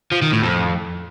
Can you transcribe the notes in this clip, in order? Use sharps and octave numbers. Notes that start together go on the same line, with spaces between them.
F3
D#3
A2
F2